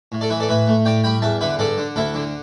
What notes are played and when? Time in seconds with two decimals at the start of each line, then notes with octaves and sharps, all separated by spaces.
0.12 A2
0.21 A4 D5
0.30 E3 B4 E5
0.40 A4 D5
0.49 A2 B4 E5
0.67 A3
0.85 A2 D5 G5
1.04 G3 G5 B5
1.22 E2 E5 A5
1.41 D3 B4 E5
1.59 G2 A4 D5
1.78 D3
1.96 D2 E4 A4
2.14 D3